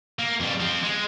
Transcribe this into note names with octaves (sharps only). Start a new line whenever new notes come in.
A#3
F2 G3
F3 C4
G#3